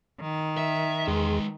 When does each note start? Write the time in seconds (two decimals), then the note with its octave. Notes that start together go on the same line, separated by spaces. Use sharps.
0.21 D#3
0.57 E5
1.07 E2 G#3 G#4 B4 C6